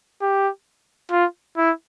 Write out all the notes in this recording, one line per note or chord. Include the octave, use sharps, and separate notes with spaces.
G4
F4
E4